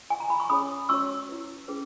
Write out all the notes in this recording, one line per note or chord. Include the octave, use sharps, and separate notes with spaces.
G#5
A#5
B5
C#6
C#4 G#4 C#5 B5 D#6
C#4 F#4 C#5 C#6 E6
E4 B4
C#4 G#4 B4